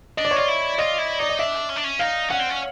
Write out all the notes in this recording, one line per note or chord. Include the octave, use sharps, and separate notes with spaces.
D4 D#5
D5
C#5
F4 D5
E4
F4 D#5
E4
D#4 D5
D#5
D4 E5
C#4
D4
C#4
D#4 F5
C#4 F#5
C4
C#4